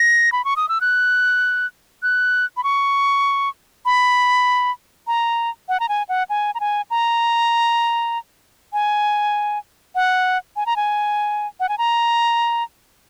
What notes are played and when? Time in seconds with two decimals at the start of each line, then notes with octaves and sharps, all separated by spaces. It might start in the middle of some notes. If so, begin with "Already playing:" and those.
Already playing: A#6
0.32 B5
0.45 C#6
0.56 D#6
0.69 E6
0.81 F#6
2.03 F#6
2.57 B5
2.64 C#6
3.86 B5
5.07 A#5
5.69 F#5
5.80 A#5
5.89 G#5
6.09 F#5
6.30 G#5
6.55 A#5
6.60 G#5
6.90 A#5
8.73 G#5
9.95 F#5
10.56 G#5
10.66 A#5
10.76 G#5
11.60 F#5
11.69 G#5
11.78 A#5